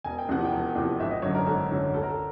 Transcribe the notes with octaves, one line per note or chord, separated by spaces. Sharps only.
E1 G#5
G5
E2 C3 F3 F#5
G5
E1
E2 C3 F3
G#1 E5
D#5
F#2 D3 F#3 C#5
A#4
G#1 A4
F#2 D3 F#3
D2 A4
A#4
A4